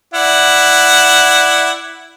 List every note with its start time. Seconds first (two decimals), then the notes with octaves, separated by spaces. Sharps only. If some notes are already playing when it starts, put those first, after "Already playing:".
0.14 E4 D5 F#5